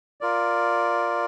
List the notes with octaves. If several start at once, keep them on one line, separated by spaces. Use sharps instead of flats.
F4 A#4 D5